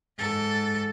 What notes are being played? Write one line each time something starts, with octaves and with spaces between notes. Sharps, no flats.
G#2 A4